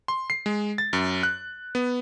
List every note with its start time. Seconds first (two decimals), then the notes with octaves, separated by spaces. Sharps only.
0.08 C6
0.30 C7
0.46 G#3
0.78 A6
0.93 F#2
1.23 F#6
1.75 B3